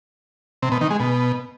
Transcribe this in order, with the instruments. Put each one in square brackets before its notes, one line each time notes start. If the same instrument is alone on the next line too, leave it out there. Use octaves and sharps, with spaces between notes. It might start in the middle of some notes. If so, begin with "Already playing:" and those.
[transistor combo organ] C3
B2
D#3
G#3
B2